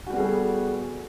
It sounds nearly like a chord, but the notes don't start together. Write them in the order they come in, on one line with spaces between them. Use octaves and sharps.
F#4 G3 B3 G#4 A4